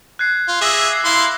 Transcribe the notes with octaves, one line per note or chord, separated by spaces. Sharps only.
F#6 G#6 C7
F4
G#4 E5 D6 E6 A#6
C7
E4 F5 C6